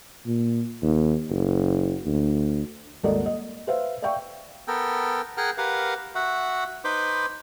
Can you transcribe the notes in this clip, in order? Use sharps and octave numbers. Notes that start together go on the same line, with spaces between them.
A#2
D#2
F#1
D2
D#1 G#1 A4 A#4 D5 D#5
D#5
B4 C5 E5 F5
D5 E5 F5 G5 C#6
B3 A4 A#4 G5
G#4 A#4 F#5 G5 F6 F#6
G4 A#4 B4 F5 F#5
F#4 E5 F#5
D#4 B4 C5 B5 C6 D6